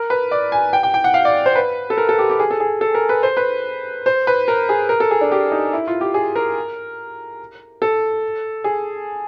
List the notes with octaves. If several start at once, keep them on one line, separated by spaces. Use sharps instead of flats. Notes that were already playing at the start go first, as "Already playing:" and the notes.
Already playing: A#4
B4
D5
G#5
G5
G5
G5
F#5
F5
D5
C5
B4
A4
A#4
A4
G4
G4
G#4
A4
G#4
A4
A#4
B4
C5
B4
C5
B4
A#4
G#4
A#4
A4
G#4
D4
G4
D#4
E4
F4
G4
G#4
A#4
A4
G#4